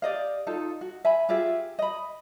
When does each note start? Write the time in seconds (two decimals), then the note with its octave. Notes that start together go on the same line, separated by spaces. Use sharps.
0.02 G4 D5 D#5 F5
0.47 D#4 F4 A4
0.81 F#4
1.05 E5 G#5 B5
1.29 F4 G4 G#4 E5
1.79 D#5 B5